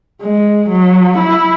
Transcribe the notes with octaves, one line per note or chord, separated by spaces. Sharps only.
G#3
F#3
E4